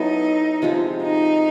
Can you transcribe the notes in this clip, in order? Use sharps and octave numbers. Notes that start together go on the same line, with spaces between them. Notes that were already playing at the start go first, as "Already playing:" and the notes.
Already playing: F#3 B3 D#4 E4 A4
C3 F3 G#3
D#4